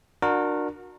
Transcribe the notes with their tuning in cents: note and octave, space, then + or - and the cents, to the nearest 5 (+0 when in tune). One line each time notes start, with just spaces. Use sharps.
D4 +25 F#4 -25 A#4 +5